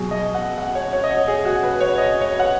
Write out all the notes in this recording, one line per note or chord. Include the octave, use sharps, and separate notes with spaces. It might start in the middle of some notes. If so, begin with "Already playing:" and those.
Already playing: B2 F#3 G#4
D#5
F#5
F#5
C#5
C#5
D#5
C#5
G#4
F#4
B4
C#5
D#5
C#5
F#5